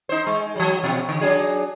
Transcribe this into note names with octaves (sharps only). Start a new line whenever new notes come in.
D#4 C5
G#3
F3 F#3
B2 F3
D3
F#3 D4 G#4